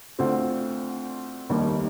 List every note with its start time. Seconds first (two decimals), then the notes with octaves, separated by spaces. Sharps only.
0.19 D2 D3 A3 C4 F4
1.49 F1 D#2 D#3 G3 A#3